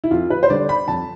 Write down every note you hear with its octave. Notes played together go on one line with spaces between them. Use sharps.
E4
F2 F4
B4
C5
D3 G3 D5
B5
F2 A5